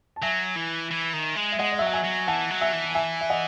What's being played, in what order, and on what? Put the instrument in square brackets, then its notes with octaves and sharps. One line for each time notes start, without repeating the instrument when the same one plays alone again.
[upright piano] A5
[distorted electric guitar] F#3 [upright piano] E5 G#5
[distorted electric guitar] E3
E3
D#3
G#3
[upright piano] E5
[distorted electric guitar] G#3 [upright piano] D#5 F#5
[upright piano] D#5
E5
[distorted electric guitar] F#3
[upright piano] F#5
E5 G#5
[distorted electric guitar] F#3
[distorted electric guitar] E3 [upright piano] F#5 A5
[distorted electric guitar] F#3
[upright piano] E5 G#5
[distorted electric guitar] E3
[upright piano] E5 G#5
E5
D#5 F#5